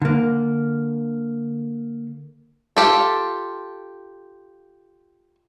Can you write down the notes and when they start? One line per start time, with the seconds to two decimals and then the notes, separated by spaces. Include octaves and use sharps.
0.02 D3 A#3
2.77 F4 G4 A4